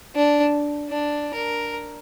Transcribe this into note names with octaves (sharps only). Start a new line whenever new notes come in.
D4
D4
A#4